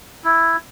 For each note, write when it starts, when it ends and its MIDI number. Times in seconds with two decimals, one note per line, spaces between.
0.24 0.57 64